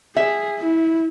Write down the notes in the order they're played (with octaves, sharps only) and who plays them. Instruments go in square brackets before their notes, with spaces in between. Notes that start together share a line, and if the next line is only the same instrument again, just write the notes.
[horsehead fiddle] G#4 [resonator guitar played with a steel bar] E5
[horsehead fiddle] E4